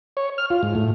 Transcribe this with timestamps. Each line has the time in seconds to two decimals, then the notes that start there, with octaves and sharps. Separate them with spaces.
0.17 C#5
0.38 F6
0.50 F4
0.63 G#2
0.75 A2